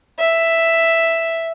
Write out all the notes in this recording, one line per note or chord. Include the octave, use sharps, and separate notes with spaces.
E5